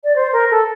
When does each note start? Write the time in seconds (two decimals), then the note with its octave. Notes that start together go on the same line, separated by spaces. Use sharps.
0.04 D5
0.15 C5
0.32 A#4
0.50 A4